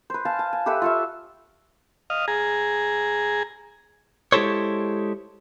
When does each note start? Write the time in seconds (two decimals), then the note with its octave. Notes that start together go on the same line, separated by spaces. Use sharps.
0.10 B4 C5
0.25 F5 G#5 A5
0.39 A5
0.53 G#5
0.66 G4 A4 B4 E5
0.82 F4 C#5 E5
2.10 D#5 F5
2.28 G#4 A#5
4.32 G#3 E4 G4 A4 C5 C#5